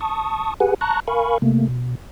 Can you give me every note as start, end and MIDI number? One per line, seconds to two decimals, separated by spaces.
0.01 0.54 81
0.01 0.54 85
0.01 0.54 87
0.60 0.74 67
0.60 0.74 68
0.60 0.74 71
0.60 0.74 78
0.60 0.74 80
0.81 1.00 81
0.81 1.00 82
0.81 1.00 85
0.81 1.00 90
0.81 1.00 94
1.08 1.38 70
1.08 1.38 77
1.08 1.38 80
1.08 1.38 83
1.08 1.38 85
1.42 1.68 48
1.42 1.68 57
1.42 1.68 58
1.68 1.95 47